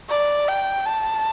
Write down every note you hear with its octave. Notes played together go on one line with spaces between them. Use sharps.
D5
G5
A5